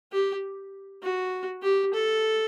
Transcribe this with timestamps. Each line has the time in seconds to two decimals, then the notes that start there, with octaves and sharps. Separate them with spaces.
0.12 G4
1.03 F#4
1.63 G4
1.93 A4